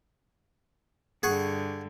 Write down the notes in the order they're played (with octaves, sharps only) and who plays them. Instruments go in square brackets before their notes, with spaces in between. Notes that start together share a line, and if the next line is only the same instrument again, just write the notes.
[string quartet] G2 D3 [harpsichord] G#4 F#5 C#6